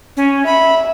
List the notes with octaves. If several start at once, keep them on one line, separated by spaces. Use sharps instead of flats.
C#4
E5 B5